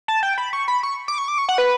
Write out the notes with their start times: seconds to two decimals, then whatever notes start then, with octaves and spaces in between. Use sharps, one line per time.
0.08 A5
0.23 G5
0.38 B5
0.53 C#6
0.68 B5
0.83 C#6
1.08 D6
1.18 C#6
1.28 D6
1.38 C#6
1.49 F#5
1.58 B4